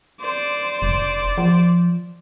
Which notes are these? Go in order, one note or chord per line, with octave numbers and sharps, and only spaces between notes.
C5 D5
F1
F3